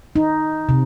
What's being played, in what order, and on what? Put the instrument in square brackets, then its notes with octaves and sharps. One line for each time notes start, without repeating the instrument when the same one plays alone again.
[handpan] D#4
C3